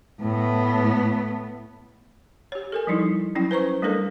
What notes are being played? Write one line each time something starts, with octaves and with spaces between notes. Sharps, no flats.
A2 B3
G4 C#5
A4 A#4 G#5
F3 G3 D#4 E4
F#3 C#4 E4 G5
B4 C5 A#5 C#6
G3 A3 D4 A4 A#4